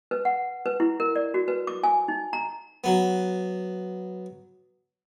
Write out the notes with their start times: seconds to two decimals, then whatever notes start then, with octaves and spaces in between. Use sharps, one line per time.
0.11 B4
0.25 F#5
0.66 B4
0.80 E4
1.00 A#4
1.16 D5
1.34 F#4
1.48 B4
1.67 D6
1.83 G#5
2.08 D#4
2.33 A#5
2.84 F#3 B3